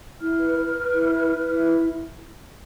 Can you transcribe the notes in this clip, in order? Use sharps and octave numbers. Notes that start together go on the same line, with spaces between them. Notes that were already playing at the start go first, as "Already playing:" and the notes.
E4 F6
B4
B4
B4
E4
B4
B4
E4